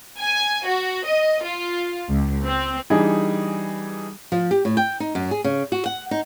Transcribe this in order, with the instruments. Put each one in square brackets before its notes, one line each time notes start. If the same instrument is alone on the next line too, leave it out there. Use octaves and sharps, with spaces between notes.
[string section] G#5
F#4
D#5
F4
C#2
C4
[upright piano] E3 G3 D4 D#4 G#4
[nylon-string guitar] F3
G4
A2
G5
D#4
F#2
G#4
C#3
F#4
F#5
D#4